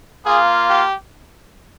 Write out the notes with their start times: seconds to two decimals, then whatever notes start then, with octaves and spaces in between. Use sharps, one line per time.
0.25 A#3 F4 G#4
0.68 G4